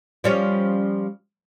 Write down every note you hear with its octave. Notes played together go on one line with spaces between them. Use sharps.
F3 G3 C#4